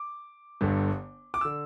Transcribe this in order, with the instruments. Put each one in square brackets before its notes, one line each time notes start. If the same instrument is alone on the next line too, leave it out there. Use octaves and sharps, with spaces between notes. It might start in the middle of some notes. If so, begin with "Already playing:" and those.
Already playing: [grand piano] D6
G1 G2 D3
D6
D3 E6